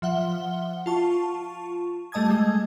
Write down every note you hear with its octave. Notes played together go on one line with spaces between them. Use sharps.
F3 E5 F#5 G7
F4 A5 C#6
G3 A3 D#5 A5 D#6 G#6
G#3